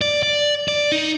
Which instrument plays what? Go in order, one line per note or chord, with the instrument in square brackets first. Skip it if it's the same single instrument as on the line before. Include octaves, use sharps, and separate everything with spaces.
[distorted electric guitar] D5
D5
D5
D#4